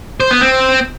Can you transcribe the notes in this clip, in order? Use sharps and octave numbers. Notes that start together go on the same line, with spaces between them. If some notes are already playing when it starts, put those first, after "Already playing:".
C5
B3
C4